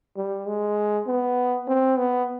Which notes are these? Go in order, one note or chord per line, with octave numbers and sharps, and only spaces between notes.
G3
G#3
B3
C4
B3